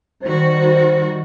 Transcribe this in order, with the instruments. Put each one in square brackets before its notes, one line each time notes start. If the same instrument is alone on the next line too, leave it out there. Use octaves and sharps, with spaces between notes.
[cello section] D#3 G3 F#4 [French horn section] C5